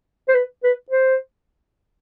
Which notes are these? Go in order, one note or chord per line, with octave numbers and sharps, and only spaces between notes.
C5
B4
B4
C5